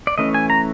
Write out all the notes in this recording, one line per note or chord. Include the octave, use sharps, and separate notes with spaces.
D5
E3 A3 C#4 D#5
G#5
A#5